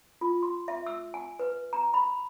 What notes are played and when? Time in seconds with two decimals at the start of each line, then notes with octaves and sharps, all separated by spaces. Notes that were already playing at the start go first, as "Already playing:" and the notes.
0.21 F4
0.43 C6
0.68 E5
0.86 E6
1.14 G#5
1.39 B4
1.73 A#5
1.94 B5